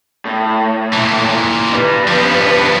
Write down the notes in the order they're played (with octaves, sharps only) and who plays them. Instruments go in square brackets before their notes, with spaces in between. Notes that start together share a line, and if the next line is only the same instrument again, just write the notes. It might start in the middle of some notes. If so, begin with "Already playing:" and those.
[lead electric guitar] A2
[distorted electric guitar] A#2 E3
[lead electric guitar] G3 B4
[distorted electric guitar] F3 B3